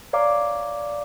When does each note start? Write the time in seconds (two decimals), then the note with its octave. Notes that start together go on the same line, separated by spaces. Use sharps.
0.13 C#5 D5 F5 A#5 D6